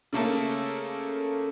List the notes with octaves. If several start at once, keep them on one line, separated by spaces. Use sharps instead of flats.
C#3 A3 A#3 A4